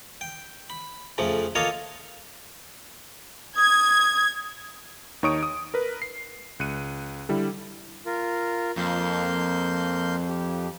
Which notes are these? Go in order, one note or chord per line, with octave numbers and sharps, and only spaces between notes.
G5
B5
F2 C#3 F3 A3
A#3 F4 A4 C#5 D#5 F5
D#6 G#6
D#2 D#4 C#5 C#6 D#6 D7
D#6
A#4 B4
C7
C#2 F#6 C#7 D#7
D3 G3 E4
F4 A#4
F2 A#3 C6 G6
G4